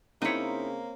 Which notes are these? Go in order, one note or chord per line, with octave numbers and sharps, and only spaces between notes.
C#3 A#3 C4 D#4 E4 C#5